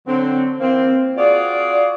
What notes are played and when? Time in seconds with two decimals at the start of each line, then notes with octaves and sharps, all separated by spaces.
0.07 D3 F#3 C4
0.61 E3 A#3 C4
1.17 F4 F#4 G#4 D5